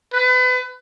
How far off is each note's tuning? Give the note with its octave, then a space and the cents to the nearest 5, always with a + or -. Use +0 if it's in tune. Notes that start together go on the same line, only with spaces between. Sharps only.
B4 +35